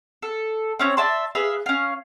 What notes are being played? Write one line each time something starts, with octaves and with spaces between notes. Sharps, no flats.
A4
C4 C#4 C#5
D5 E5 A5 C6
G#4 B4 E5 F5
C#4 F5